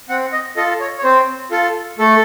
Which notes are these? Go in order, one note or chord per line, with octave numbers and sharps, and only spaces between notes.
C4 F#5
D#5
F4 A4 D#5
C#5
C#5
C4 C5
F4 A4
A3 A4